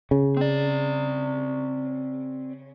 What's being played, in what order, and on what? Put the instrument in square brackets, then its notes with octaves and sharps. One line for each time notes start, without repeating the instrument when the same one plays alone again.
[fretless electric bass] C#3
[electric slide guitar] C4 D5